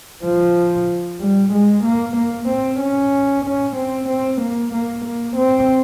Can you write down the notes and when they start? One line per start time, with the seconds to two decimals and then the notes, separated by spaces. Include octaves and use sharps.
0.24 F3
1.20 G3
1.53 G#3
1.84 A#3
2.16 A#3
2.49 C4
2.80 C#4
3.45 C#4
3.76 C4
4.09 C4
4.41 A#3
4.73 A#3
5.05 A#3
5.37 C4